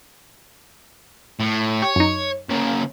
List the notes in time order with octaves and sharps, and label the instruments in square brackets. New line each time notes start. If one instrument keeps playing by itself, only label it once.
[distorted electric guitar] A2
[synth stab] G4 [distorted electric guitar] C#5
[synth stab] F#2 D#4
[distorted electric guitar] C#3 A#3